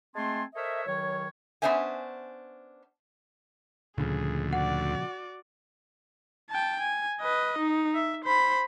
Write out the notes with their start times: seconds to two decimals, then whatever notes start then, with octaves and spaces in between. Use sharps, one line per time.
0.15 G#3 A3 C4 G#5 A5 C6
0.55 A4 A#4 C5 C#5 D#5 E5
0.86 C#2 D#3 F#3 C#5
1.62 B3 C#4 D4 C5 E5 G#5
3.98 D2 A#2 C#3 F3 G#4
4.53 F#4 D5 F#5
6.50 G5 A5
6.80 G#5
7.20 B4 D#5
7.58 D#4
7.95 E5
8.24 C5 B5